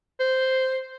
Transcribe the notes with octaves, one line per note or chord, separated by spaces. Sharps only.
C5